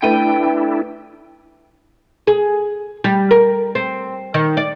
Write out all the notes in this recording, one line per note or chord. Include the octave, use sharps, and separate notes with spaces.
A3 D4 E4 B4 G5 D#7
G#4
G3
A#4
C4
D#3
D5